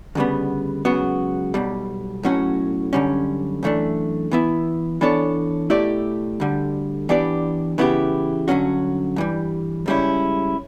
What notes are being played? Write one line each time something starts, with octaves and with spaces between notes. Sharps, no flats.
D2 C#3 G3 B3
C#2 C#3 F#3 B3 F#4
B1 B2 G3
B1 A2 F#3 C#4 F#4
F#2 D3 G3 C#4
F#2 E3 A3 D4
E3 B3 E4
E3 B3 D4 A4 C#5
B2 A3 E4 G4 D5
D2 D3 G3
E3 B3 D4 G4 D5
C#3 E3 B3 E4 G4
G2 D3 F#3 C#4 F#4
G2 E3 G3
C#2 C#3 G3 C#4 E4